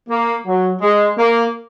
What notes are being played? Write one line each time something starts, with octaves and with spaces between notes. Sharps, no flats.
A#3
F#3
G#3
A#3